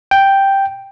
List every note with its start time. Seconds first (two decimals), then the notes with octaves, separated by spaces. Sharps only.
0.11 G5